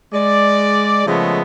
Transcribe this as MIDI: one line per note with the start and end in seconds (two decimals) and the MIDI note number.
0.13 1.02 56
0.13 1.02 74
1.06 1.42 49
1.06 1.42 53
1.06 1.42 56
1.06 1.42 57
1.06 1.42 59